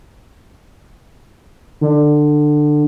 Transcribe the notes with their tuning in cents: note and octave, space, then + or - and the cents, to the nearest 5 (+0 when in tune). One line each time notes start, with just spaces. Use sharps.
D3 +20